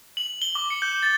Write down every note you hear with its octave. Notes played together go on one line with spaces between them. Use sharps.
F#7
G7
D6
C#7
G6
A6